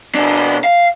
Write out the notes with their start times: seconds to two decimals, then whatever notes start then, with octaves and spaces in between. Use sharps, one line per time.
0.15 B2 D4
0.64 F5